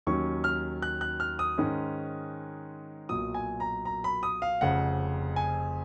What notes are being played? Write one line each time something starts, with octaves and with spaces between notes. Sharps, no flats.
D#2 D#3 F#3 C#4 C#6
F6
F#6
F#6
F6
D#6
G#2 D#3 G#3 C#4
B1 A#2 F#3 D#6
G#5
A#5
A#5
B5
D#6
F5
F1 F2 C#3 F#5
G#5